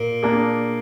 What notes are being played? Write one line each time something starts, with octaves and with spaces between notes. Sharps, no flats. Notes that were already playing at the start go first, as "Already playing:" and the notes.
Already playing: A#2
A#3 D4 G#4